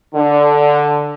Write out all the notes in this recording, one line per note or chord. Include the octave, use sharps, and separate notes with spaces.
D3